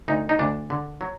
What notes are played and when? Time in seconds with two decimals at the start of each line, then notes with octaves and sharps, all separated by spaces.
0.08 D2 D#4
0.29 D#4
0.39 D2 D4
0.70 D3
1.01 F#3